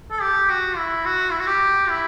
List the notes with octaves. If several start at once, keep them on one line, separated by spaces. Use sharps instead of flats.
A4
G4
F#4
E4
F#4
E4
F#4
G4
E4